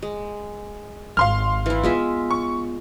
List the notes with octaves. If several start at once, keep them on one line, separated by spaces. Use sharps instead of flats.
G#3
G#1 F5 C6 F6
E3 E4
G#3 B3 F4 E5
C#6